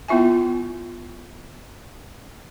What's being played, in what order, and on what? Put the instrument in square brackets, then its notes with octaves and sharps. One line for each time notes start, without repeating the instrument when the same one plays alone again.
[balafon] B3 E4 F4 E5 G#5